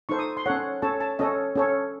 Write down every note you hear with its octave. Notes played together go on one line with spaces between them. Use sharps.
D#4 A4 C5 C#6
D#6
C6
C#4 A4 C#5 F#5
C#4 A4 C#5 A5
A5
C#4 A4 C#5 D#5
C#4 A4 C#5